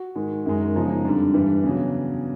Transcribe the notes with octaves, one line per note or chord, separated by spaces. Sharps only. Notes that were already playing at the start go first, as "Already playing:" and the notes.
Already playing: F#4
G#2 D#3 G#3
F#2 D#3 G#3
E2 C#3 F3 G#3 D#4
D#4
F2 D3 G3 D4
G2 E3 G3
E2 C#3 F#3